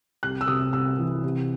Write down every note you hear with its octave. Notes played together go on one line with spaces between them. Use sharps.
C2 F#6
E6
C3 D#6
C2 E6
E3
C3